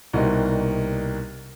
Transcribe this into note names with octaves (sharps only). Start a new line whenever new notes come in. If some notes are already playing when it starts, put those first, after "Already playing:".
C2 B2 G3 A#3 D#4